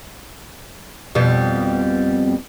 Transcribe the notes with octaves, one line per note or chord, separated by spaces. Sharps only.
F2 B2 G3